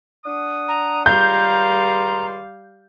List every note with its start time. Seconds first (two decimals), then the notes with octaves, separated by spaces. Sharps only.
0.25 D4 F#5 D#6
0.68 A#5
1.06 C#2 D#3 G3 F5 A#5 C6 G6